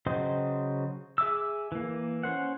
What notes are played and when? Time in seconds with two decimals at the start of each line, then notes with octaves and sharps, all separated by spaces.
0.06 C#3 F#3 C5 D#5 G5
1.18 G#4 E5 D6 E6
1.72 E3 A#3
2.23 C#4 C5 F#5